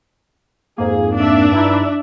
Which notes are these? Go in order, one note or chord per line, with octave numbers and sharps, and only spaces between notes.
F2 G#2 A#3 G#4
D4 E5
G2 D#4 E4